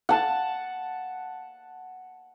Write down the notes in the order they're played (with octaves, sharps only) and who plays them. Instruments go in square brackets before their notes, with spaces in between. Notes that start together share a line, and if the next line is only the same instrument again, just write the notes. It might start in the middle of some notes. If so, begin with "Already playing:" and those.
[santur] F#5 A5